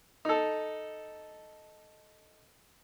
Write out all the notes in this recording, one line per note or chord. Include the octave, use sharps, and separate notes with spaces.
D#4 A4